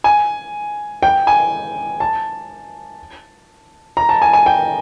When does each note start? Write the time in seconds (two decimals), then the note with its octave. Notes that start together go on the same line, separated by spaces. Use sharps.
0.04 G#5
1.03 G5
1.27 G#5
2.00 A5
3.97 A#5
4.09 A5
4.22 G#5
4.33 G#5
4.46 G5